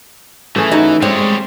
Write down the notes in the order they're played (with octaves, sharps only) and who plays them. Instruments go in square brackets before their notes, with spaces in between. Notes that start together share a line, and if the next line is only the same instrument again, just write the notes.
[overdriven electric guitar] E3 [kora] A3 C#4 G#4
[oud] D#4 F#4
[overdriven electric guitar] G3 C#5 [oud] G#3 [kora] C4 D5